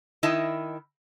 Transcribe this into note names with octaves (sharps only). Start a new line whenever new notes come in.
D#3 E4 D#5 E5 A5